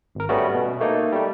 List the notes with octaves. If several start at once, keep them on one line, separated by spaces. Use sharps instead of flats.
G#1 A#4
G3 A3 B3 C#4 F#4
B2
A3 A#3 D#4
G3 A3